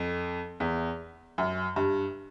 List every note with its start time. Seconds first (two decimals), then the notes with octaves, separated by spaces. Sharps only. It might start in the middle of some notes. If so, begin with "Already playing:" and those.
Already playing: F2
0.60 E2
1.38 F#2
1.76 G2